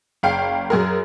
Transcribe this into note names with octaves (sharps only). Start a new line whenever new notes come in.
F#1 F5 G5 C7
F#2 G#4 A#4